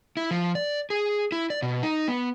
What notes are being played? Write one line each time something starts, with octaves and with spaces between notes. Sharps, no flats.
E4
F3
D5
G#4
E4
D5
B2
D#4
B3